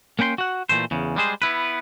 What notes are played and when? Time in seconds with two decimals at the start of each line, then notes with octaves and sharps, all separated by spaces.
0.19 A#3 C#4 G5 B5 C6
0.38 F#4 F#5
0.69 A#2 E3 A3 C5
0.91 E2 C#3
1.16 G3 G#3 G#4 C5
1.42 B3 E4 B4